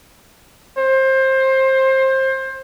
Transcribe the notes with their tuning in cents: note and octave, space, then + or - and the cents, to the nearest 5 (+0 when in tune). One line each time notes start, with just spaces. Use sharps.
C5 +20